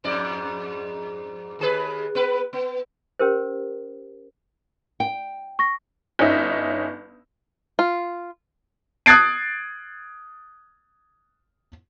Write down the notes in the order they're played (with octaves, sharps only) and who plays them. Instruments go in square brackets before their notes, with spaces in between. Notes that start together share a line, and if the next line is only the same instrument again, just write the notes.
[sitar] F2 G#2 D5
D#2 G#4 B4
B3 B4
B3
[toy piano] C#4 G4 A#4 C5
[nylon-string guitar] G5
[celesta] C#6 A#6
[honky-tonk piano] G1 C#4 D#4 E5
[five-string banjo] F4
[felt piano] D#6 F#6 G#6 A6 C7 D7